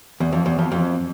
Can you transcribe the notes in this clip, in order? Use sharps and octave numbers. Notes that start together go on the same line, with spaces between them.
E2
F2
E2
F2
F2